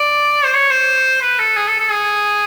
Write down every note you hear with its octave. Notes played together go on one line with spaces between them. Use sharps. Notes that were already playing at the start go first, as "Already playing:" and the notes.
Already playing: D5
C5
C#5
C5
B4
A4
G#4
A4
A4
G#4